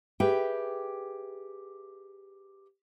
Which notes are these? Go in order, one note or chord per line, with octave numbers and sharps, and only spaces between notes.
G4 G#4 B4 E5 G5